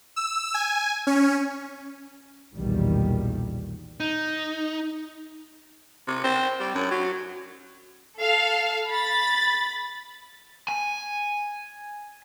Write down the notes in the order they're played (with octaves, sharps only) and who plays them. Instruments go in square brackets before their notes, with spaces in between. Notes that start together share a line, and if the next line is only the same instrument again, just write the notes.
[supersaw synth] E6
G#5
C#4
[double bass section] B1 E2 A#2 D#3 G3
[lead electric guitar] D#4
[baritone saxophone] C3
C4
G3
F#2
F#3
[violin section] A4 F5
B5 A6
[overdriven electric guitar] G#5